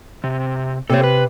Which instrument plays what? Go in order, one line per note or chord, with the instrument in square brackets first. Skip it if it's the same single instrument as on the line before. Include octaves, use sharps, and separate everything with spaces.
[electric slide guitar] C3
[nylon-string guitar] C3 C4 [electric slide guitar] A4 C#5
[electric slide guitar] B4